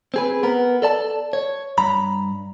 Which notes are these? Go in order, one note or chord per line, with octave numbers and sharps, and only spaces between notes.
C4 G#4 B4
B3 A#4
A4 D5 A5
C#5
G2 A#5 B5